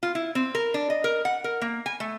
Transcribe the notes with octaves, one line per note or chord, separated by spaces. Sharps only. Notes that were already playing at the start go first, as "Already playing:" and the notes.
F4
E4
C4
A#4
D4
D#5
A#4
F#5
A#4
A#3
G#5
A3